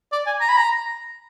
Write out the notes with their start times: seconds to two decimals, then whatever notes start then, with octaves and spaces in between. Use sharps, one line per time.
0.12 D5
0.26 G#5
0.41 A#5
0.49 B5
0.57 A#5